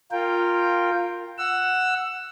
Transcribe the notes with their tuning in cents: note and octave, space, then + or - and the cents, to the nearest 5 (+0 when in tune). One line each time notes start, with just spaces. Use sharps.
F4 +5 A#4 -10 G5 +5
F#5 +0 E6 +15